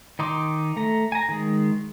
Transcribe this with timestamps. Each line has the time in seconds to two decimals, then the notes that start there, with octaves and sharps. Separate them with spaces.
0.19 D#3 D#4 C6 D6
0.77 A3 A#5
1.12 G#5 A#5
1.29 D#3 G#3